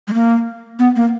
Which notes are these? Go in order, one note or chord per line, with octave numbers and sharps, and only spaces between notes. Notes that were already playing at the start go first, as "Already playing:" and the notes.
G#3
A#3
B3
A#3